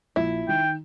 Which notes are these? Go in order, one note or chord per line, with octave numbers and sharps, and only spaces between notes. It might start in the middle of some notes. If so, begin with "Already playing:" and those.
A#1 E4
D#3 G5